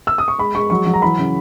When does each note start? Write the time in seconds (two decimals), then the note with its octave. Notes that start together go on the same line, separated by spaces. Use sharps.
0.07 E6
0.18 D#6
0.28 C#6
0.38 G#3 B5
0.55 G#3 C#6
0.70 F#3 C#6
0.86 F#3
0.94 A#5
1.02 E3 B5
1.19 C#3